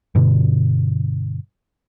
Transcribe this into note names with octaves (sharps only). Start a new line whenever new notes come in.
G2 B2 D3